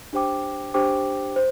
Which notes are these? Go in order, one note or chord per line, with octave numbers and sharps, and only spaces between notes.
D4 G4 C5 G5 D6
D4 G4 C5 G5 D6
C5